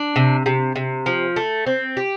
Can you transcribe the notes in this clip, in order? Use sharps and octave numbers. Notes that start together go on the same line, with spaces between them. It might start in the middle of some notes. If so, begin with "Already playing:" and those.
Already playing: D4
C3
C3
C3
F3
A3
C4
G4